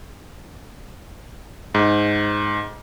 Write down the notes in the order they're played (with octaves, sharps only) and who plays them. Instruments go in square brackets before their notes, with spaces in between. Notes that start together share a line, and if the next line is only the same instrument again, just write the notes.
[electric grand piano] G#2